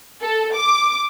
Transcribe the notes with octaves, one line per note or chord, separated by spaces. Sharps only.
A4
D6